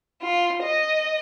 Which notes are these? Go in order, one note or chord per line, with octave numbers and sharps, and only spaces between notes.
F4
D#5